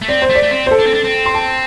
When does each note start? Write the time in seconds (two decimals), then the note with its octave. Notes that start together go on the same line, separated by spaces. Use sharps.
0.01 A3
0.08 C4 D5
0.22 C5
0.29 A3
0.35 D5
0.42 A3
0.51 C4
0.67 C5
0.71 A4
0.79 D4
0.86 C4
0.94 D4
1.04 C4
1.26 C6
1.35 A5